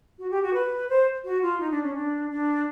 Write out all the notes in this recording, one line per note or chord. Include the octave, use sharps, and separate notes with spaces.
F#4
G4
F#4
B4
C5
F#4
F4
D#4
D4
C#4
D4
D4